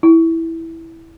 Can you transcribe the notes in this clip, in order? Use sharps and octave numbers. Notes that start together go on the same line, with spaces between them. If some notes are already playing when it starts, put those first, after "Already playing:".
E4